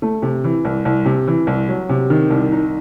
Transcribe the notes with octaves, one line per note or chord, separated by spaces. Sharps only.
A3
C3
E3
C2
C2
C3
E3
C2
F#3
C3
D#3
C2
D#4